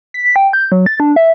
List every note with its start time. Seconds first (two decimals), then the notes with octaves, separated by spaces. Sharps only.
0.14 B6
0.36 G5
0.53 G6
0.72 F#3
0.86 A6
1.00 D4
1.16 E5